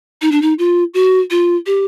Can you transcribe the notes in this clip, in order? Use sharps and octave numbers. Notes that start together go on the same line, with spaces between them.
D#4
D4
D#4
F4
F#4
F4
G4